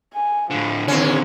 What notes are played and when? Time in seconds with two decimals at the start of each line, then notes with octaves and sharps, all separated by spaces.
0.14 G#5
0.50 A2 D3 F3
0.88 D#2 D3 C4 C#4